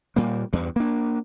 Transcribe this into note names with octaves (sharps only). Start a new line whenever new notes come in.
A#2 G3 A#3
E2 G2
A#3 D4